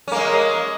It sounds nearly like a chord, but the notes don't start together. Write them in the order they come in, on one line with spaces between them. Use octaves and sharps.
C#4 A#3 G#3